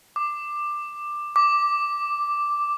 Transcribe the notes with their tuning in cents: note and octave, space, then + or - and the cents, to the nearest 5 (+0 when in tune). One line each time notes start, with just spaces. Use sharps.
D6 +15
D6 +0